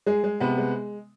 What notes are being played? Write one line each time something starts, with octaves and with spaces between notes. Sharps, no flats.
G#3 G#4
G#3
C3 B3 B4
G#3